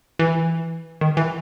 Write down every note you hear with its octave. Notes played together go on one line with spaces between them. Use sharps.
E3
D#3
E3